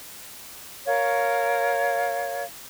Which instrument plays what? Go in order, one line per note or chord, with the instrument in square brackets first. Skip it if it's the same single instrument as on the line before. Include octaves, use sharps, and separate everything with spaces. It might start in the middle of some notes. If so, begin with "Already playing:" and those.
[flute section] A#4 C#5 F5